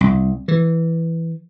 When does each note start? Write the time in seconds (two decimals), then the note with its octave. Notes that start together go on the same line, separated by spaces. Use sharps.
0.01 C2
0.48 E3